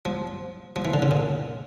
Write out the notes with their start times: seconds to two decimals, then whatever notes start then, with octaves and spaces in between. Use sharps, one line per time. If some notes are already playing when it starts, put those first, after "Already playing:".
0.05 F3
0.76 F3
0.85 E3
0.94 D3
1.02 C#3
1.11 A#2